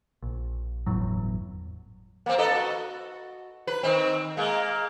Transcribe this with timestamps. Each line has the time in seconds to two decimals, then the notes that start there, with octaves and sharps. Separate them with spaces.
0.22 A#1
0.86 G1 E2 A2 F#3
2.26 A#3 C4
2.38 A4 B4 D#5
2.55 F#4
3.67 B4
3.83 D#3 C4
4.37 G#3 A#3